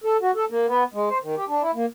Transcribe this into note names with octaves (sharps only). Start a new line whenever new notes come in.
A4
F#4
A4
A#3
B3
G#3
C5
D#3
G4
D4
E4
A#3